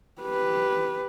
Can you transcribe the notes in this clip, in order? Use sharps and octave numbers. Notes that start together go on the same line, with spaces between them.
G4 B4